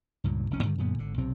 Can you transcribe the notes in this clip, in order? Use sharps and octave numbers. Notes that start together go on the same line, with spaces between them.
C#2 G2 A#2
F1 C2 C#4
G2 D3 D#3
F#2 A#2 D3 B3
G#1 D3
B1 C3 C4